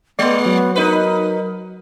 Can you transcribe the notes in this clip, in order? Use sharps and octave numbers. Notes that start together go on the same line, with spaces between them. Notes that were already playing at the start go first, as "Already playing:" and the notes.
G#3 B3 D5 D#5 C6
F#3 F#4
D#4 A#4 B4